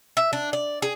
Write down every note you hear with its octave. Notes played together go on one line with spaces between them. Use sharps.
E5
D4
D5
G#4